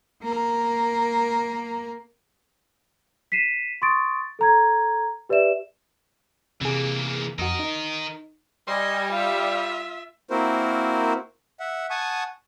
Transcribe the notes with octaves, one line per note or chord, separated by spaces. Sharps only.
A#3 A#4
B6 C7 D#7 E7
C6 C#6 D#6 A6 D7
A4 A#5 G#6
G4 B4 D5 E5 E7
C3 E3 A#3 G#4
F2 F#4 A#4 D#5
D#4
G3 D#5 G#5 C6
F4 E5 F5
A#3 C4 E4 F#4 A#4 C5
E5 F#5
F#5 G#5 A5 C#6 D#6